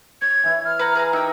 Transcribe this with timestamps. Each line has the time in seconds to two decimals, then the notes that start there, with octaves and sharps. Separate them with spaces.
0.22 C#5 G#6
0.44 E3 E4 B4
0.65 F6
0.79 A4 B4 F#5 A#5
0.95 G#4 F5 A#5
1.13 D#4 G4 A#4 B4 E6